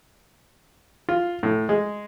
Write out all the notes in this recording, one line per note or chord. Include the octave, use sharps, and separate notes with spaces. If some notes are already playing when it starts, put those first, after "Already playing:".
F4
A2
G#3